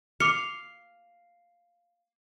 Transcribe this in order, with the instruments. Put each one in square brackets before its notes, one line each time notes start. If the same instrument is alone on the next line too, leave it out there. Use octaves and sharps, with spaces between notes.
[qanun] F5 [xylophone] D6 C#7